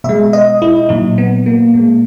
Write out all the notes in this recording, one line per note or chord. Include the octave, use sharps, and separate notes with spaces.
B2 G#3 E5
D#5
E4
A#2 F#3 D#4
B3
A#3
A#2 G#3 A#3